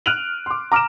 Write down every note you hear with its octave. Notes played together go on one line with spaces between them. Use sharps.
F6 F#6 D7 D#7 F7 F#7
C6 D6
A#5 D6 F6 D7 E7